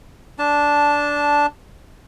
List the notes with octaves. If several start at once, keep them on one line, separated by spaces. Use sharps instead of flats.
D4 A5